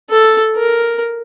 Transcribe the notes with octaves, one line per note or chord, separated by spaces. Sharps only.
A4
A#4